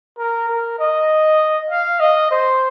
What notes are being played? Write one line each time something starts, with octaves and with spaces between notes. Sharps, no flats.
A#4
A#4
D#5
F5
D#5
C5